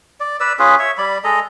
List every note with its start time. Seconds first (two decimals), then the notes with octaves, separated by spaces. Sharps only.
0.20 D5
0.40 B4 D5 E6
0.59 C#4 F4 G#4 B4
0.79 C#5 E5
0.98 G3 D5 B5
1.24 G#3 A4 D#5 A#5